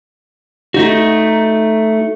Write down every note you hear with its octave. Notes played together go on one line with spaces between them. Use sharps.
A3 D#4 F#4